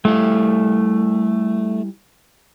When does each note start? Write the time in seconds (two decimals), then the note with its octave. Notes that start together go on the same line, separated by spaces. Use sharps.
0.05 G3 A3 E4 F5